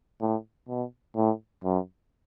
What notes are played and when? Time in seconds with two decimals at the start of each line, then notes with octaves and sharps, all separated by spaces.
0.21 A2
0.69 B2
1.16 A2
1.64 F#2